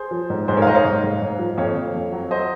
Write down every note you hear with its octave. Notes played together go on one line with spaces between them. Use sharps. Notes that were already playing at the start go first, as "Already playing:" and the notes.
Already playing: G#4 C5
F3
G#2
G#2 G#4 C5
A#4 C#5 F5
G#2 C5 D#5
C#5 F5
G#2
G#2
G#2
F3
F2 C#5 F5
F2
F2
F#3
C5 D#5